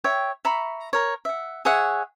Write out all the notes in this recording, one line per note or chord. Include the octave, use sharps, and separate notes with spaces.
C#5 E5 G5
E5 A#5 B5 C#6
A#4 C#5
E5 F#5
G#4 C#5 E5 F#5